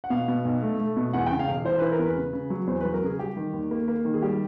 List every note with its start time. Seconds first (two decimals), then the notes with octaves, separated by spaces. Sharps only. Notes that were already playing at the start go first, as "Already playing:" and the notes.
0.04 F#5
0.10 B2 F5
0.28 B2
0.45 B1
0.62 A3
0.79 A3
0.97 B2
1.13 E2 F#5
1.26 G5
1.31 C#3
1.39 F5
1.48 E1
1.65 E3 C5
1.79 E3 B4
1.92 A#4
1.99 E2
2.06 B4
2.16 C#3
2.33 C#3
2.50 F#3
2.67 E2 C5
2.81 B4
2.85 F#3
2.94 A#4
3.02 C#3 G#4
3.19 G3 G4
3.37 D#3
3.53 D#2
3.71 A#3
3.88 A#3
4.05 D#3
4.14 G#4
4.22 G3 G4